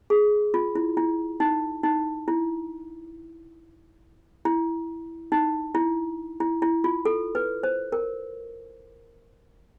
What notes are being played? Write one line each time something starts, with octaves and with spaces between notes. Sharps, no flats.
G#4
F4
E4
E4
D#4
D#4
E4
E4
D#4
E4
E4
E4
F4
A4
B4
C5
A#4